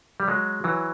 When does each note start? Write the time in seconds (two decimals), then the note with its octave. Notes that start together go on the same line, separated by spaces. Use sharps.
0.20 G3
0.28 F#3 G#3
0.64 E3 F#3